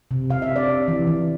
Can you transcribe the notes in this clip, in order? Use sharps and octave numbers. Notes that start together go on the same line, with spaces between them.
C3
C3 F5
E5
C3
D5
C3
E3
E3